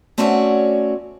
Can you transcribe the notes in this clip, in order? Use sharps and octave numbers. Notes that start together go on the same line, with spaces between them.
A3 C4 C#4 F#4 C#5 D5